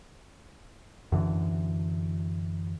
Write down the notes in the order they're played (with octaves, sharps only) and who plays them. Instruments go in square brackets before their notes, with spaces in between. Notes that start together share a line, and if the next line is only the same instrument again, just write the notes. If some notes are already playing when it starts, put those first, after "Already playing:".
[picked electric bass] F#2 D3 E3